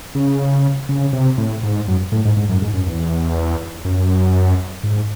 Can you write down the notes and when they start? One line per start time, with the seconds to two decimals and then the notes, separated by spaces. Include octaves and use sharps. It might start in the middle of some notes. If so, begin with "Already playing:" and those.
0.15 C#3
0.89 C#3
1.13 C3
1.38 A2
1.63 G#2
1.88 F#2
2.12 A2
2.25 G#2
2.37 G#2
2.49 F#2
2.62 G#2
2.73 F#2
2.87 E2
3.85 F#2
4.84 G#2